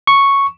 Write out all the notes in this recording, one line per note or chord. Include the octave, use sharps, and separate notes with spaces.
C#6